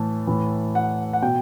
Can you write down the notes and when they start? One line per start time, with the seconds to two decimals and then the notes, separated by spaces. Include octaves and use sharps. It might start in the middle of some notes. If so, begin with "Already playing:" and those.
Already playing: A2 E3 A5
0.27 A2 E3
0.75 F#5
1.13 F#5
1.22 B2 G5